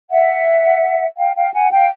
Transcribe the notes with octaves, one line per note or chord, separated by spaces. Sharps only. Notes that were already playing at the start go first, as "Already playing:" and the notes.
E5 F#5
F5 G5
F5 G5
F#5 G#5
F5 G5